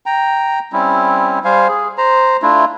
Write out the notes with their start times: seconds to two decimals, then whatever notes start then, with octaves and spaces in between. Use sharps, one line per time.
0.06 G5 A#5
0.73 G3 C4 C#4 E4
1.44 G3 C5 F5 G#5
1.68 G#4
1.98 C5 A#5
2.42 A3 D4 E4 F4